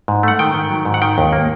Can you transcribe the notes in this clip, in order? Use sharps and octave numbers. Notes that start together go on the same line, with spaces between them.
G#2
A3 F#5
D#3 G5
D#3
F#3
G#2
F#5
D#3 G5
D#2
A#3